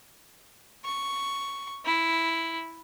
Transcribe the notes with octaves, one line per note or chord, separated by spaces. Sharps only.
C#6
E4